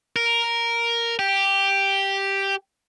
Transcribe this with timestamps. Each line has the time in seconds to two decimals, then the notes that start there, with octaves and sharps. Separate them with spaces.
0.16 A#4
1.19 G4